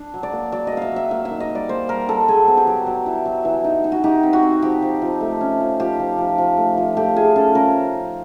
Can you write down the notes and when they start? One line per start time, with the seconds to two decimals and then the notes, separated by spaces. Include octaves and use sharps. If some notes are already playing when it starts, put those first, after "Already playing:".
Already playing: D4
0.14 F#3
0.23 D5
0.33 A#3
0.52 F#3 D5
0.67 D#5
0.72 A#3
0.77 E5 F5
0.92 F#3 E5
1.11 A#3 F5
1.25 E5
1.30 D#3
1.40 D#5
1.50 G3
1.55 D5
1.69 A#3 C5
1.89 G3 A#4
2.08 G3 A4
2.28 F#3 G#4
2.48 B3
2.57 G4
2.67 F#3
2.86 F#3
3.06 E4
3.26 F#3
3.45 E3
3.64 D#4
3.84 D#4
3.92 F#4
4.04 D#4 G4
4.23 C4
4.33 F#4
4.43 C4
4.62 F3 G4
4.82 F3
5.02 F3
5.21 A3
5.41 C#4
5.60 F3
5.79 F3 G4
6.00 F3
6.18 F3
6.38 F3
6.58 A3
6.78 F3
6.97 A3 G4
7.16 F4 G#4
7.36 C#4 A4
7.55 C#4 A#4